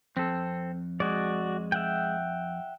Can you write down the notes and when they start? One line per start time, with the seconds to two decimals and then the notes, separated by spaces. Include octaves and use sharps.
0.17 F2 C4 A4
1.00 G#3 F#4 D5
1.72 E5 F#5 G5